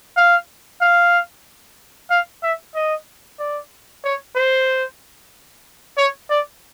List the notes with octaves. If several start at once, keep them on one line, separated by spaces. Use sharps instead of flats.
F5
F5
F5
E5
D#5
D5
C#5
C5
C#5
D5